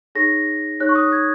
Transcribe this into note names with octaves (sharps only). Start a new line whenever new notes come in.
D#4 G#4 C#5 A#6
D#4 G#4 C#5 F#6
C#6
D#6
G#6